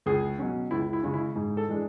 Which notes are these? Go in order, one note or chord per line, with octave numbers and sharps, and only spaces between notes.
C#2 G#4
B2 F#3 C#4
C#2 E4
E4
C#3 G#3 C#4
E4
G#2
A4
E3 G#3 D4